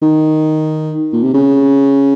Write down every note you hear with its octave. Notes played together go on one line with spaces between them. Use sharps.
D#3
A#2
C3
C#3